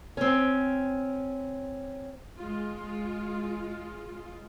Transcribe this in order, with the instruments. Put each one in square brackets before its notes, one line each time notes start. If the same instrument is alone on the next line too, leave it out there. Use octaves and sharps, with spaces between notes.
[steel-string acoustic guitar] C4 C#4
[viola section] G#3 F4